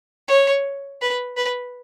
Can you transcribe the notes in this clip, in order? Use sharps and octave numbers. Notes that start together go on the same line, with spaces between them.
C#5
B4
B4